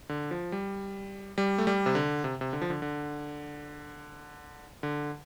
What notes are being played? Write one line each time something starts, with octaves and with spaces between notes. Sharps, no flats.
D3
F3
G3
G3
A3
G3
C3
D3
C3
C3
D3
F3
D3
D3
D3